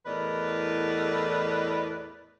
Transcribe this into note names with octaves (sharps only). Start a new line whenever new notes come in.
E2 A2 A#4 B4 D5 D#5